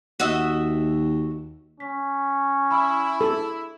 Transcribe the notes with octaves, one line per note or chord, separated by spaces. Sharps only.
D#2 F#4 D#5 E5
C#4 B6
E4 B5 E6
G#4 A4